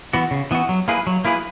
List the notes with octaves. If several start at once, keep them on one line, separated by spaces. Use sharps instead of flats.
E3 B3 F#4
C#3
E3 B3 F#4
F#3
A#3 E4 G#4 B4
F#3
A#3 E4 G#4 B4